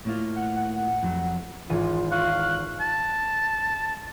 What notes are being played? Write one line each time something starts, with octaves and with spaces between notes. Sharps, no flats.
A2 A#3 F4
F#5
F#5
F2 F#3
G#1 E3 F4 D#7
F5 C#6 F#6
A5